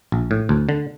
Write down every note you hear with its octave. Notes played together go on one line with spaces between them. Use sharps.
A#1
A2
D2
D3